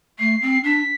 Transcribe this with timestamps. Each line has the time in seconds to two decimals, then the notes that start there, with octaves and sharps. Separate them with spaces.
0.19 A3 C7
0.42 C4
0.64 D4 B6